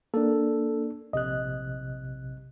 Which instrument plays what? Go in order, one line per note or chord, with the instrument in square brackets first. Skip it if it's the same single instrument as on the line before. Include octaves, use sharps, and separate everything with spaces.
[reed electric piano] A#3 D4 [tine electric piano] A4
[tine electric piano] A#1 C3 F#6 [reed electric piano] D#5